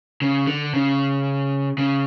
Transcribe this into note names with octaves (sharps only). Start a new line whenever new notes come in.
C#3
D3
C#3
C#3